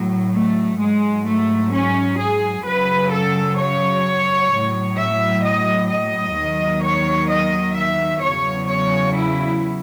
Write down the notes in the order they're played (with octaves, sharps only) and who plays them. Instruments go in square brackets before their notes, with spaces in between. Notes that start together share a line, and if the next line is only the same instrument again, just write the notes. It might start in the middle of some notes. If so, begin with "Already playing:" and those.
Already playing: [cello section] A2 F#3
A3
G#2 F#3 G#3
A3
C#4
G#4
F#2 C#3 F#3 B4
A4
C#5
A2 F#3
E5
D#5
D#5
D#2 D#3 F#3
C#5
D#5
E5
E2 C#3 F#3 C#5
C#5
E4